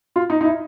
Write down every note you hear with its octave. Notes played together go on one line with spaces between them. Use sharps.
F4
D#4
D#4
E4